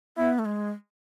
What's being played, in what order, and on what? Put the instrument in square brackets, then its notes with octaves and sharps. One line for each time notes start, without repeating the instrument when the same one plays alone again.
[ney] B3 [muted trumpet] E4
[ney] A3
G#3